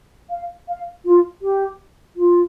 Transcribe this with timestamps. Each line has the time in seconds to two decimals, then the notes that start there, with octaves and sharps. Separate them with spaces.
0.30 F5
0.68 F5
1.05 F4
1.42 G4
2.16 F4